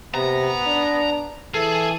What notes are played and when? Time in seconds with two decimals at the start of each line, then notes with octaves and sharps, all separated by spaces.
0.15 C3 B3 A#5
0.67 D4
1.54 E3 G#4 A4